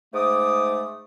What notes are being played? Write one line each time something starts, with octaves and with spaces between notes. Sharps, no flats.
G#2 A3 D6 D#6